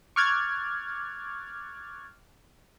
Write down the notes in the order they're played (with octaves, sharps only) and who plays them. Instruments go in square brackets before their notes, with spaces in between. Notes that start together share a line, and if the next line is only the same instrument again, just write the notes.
[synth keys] C#6 D6 F6 F#6 G#6 A6